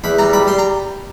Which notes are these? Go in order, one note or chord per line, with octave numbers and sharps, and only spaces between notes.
E2 B5
G3 A#5
G3 B5
G3 C6
A#5